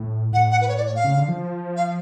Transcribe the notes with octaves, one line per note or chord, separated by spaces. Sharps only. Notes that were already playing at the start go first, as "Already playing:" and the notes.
Already playing: A2
A2 F#5
F#5
B4
C#5
D5
C#5
F5
C#3
D3
F3
F5